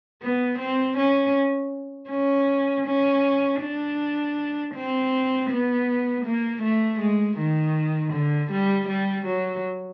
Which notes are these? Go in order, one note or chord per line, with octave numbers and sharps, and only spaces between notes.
B3
C4
C#4
C#4
C#4
D4
C4
B3
A#3
A3
G#3
D#3
D3
G3
G3
F#3